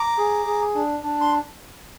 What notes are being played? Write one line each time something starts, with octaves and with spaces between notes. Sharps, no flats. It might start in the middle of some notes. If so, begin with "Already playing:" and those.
Already playing: A#5 D6
G#4
G#4
D4
D4
C6